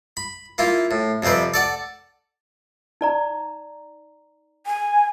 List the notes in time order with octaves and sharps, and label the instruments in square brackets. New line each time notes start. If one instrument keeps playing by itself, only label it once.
[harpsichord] B5
A#3 E4 F4
A2
F2 C3 G3 C4 B4
A4 D5 F#5
[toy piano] D#4 D5 A#5
[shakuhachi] G#5